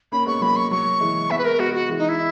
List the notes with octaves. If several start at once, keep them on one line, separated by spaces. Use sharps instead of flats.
A#3 C#4 B5
G#3 B3 C#6
F#3 A#3 B5
C#6
F#3 A#3 C#6
E3 G#3
G#3 B3 E5
B4
A#4
G#3 B3 F#4
F#4
E3 G#3
D#4
E4